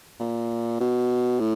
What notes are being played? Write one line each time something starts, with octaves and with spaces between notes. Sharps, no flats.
A#2
B2
A2